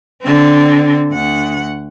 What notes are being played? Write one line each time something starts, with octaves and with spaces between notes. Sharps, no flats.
D3 C4
D2 F#5